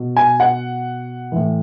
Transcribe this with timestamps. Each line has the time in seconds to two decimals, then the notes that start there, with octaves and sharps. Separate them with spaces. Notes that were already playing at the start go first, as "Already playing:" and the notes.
Already playing: B2
0.16 G#5
0.40 F#5
1.32 A2 E3